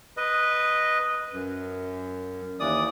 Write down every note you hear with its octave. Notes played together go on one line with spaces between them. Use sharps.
B4 D#5
F#2
D#2 E3 D5 D#6